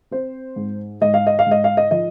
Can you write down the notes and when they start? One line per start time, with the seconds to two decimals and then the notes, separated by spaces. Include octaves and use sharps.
0.11 C4 C5
0.56 G#2
1.01 G#2 D#5
1.14 F5
1.27 D#5
1.39 F5
1.46 G#2 D#5
1.64 F5
1.77 D#5
1.91 F3 D#5